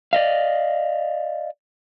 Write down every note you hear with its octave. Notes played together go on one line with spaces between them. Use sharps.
D5 D#5 F5